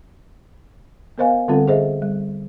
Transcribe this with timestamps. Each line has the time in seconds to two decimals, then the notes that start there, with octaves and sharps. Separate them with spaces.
1.18 B3 A#4 C5 D#5 F5 G#5
1.48 D3 G3 C4 F4 A4 F#5
1.68 G#4 C5 D#5 E5
2.02 G3